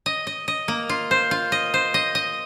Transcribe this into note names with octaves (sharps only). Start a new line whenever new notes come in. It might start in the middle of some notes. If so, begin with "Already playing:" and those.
D#5
D#5
D#5
A#3
F4
C5
F4
D#5
C5
D#5
D#5